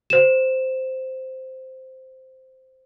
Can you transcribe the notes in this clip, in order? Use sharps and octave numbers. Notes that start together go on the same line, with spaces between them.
C5 E7